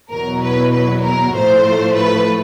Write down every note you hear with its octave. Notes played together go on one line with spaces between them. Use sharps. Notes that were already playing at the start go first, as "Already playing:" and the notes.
E2 B2 F#3 A#4
B4
B4
A#4
A2 F3 A3 C5
B4